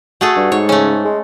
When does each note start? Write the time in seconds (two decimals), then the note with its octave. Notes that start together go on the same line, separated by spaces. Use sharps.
0.21 A3 F#4 G#4 A4
0.36 G2
0.52 G#2 C#5
0.69 C#3 A3 C#4
1.04 G#3